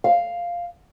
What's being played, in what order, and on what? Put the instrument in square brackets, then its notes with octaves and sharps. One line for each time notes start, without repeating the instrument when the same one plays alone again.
[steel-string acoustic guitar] F5